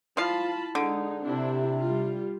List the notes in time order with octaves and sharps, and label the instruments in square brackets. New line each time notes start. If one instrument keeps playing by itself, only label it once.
[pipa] F3 F5 [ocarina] E4 [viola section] F4 A5 B5
[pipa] D3 [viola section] G#3 D#4
[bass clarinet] C3 [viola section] C4 D4 E4 [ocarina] G4
[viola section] G3 F4